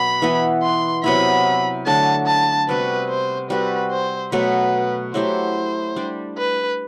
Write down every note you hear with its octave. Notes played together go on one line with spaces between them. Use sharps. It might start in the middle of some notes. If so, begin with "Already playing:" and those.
Already playing: B2 F#3 B5
E3 B3 E4
C6
C3 F#3 B3 E4 B5
D3 F#3 A3 D4 A5
A5
C3 G3 B3 F#4 B4
C5
G3 C4 F#4 B4
C5
B2 F#3 A3 B4
F#3 A3 E4 G4 C5
G3 D4 G4
B4